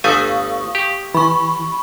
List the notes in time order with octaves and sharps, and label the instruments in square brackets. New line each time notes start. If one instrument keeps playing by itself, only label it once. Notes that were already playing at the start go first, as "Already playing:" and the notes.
[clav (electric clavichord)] G1 A3 G#5 [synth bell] F5 C#6 D#6
[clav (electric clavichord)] G4
[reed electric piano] E3 [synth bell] B5 C#6